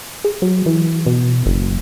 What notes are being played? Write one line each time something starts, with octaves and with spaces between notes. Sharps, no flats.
G#4
F#3
E3
B2
F#1